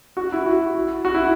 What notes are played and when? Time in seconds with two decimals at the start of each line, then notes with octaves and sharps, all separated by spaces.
0.17 F#4
0.32 E4
0.46 F#4
1.05 F#4
1.14 E4